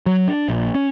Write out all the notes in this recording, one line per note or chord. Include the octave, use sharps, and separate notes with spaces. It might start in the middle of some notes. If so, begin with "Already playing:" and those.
F#3
D4
A#1
C#4